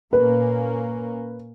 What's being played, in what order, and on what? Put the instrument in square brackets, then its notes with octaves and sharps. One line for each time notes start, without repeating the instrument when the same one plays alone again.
[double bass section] A#2 A#3 C#4 [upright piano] B4